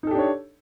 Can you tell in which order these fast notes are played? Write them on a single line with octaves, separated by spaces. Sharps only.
D#4 A4 G4 D4 C#5